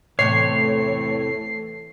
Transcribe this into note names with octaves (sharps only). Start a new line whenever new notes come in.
E2 A2 C3 E3 A3 C#5 C7